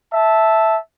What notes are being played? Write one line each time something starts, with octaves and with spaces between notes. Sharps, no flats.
E5 A5